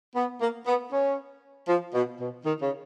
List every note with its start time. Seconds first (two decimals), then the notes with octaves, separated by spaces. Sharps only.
0.16 B3
0.41 A#3
0.67 B3
0.92 C#4
1.68 F3
1.94 B2
2.21 B2
2.45 D#3
2.62 C#3